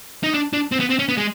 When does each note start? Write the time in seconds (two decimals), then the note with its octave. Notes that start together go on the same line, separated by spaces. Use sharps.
0.24 D#4
0.34 D4
0.53 D4
0.72 C4
0.80 B3
0.90 C4
0.99 C#4
1.09 B3
1.17 G#3